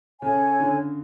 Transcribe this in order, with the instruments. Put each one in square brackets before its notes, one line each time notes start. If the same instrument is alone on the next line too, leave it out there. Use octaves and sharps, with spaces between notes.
[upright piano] C#3 [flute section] A4 C#5 G#5
[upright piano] D3